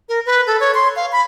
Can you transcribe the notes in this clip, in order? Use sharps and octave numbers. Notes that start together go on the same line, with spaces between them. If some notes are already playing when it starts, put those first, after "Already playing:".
A#4
B4
A4
C#5
C6
F5
B5